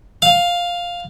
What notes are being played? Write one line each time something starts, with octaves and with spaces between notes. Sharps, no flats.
F5